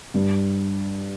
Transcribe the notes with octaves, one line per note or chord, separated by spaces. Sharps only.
G2